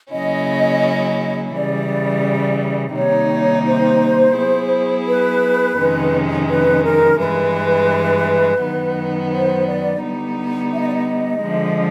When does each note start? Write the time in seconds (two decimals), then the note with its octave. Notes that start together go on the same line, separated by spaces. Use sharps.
0.12 C#3 F#3 A#3 C#4 E4 D#5
1.54 C#3 E3 G3 D5
2.95 C3 D#3 G3 A#3 D#4 C#5
3.66 C5
4.36 F#3 B3 E4 G#4
5.07 B4
5.78 F2 C3 D#3 G#3 C#4
6.49 B4
6.84 A#4
7.19 G2 E3 G#3 B4
8.61 F#2 D#3 F#3 B3
9.31 C5
9.66 D5
10.02 D3 G3 B3 D#4
10.73 E5
10.80 D#5
10.88 D5
10.95 D#5
11.43 D3 F3 G#3